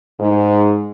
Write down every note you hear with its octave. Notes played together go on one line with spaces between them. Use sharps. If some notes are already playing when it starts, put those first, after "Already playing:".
G#2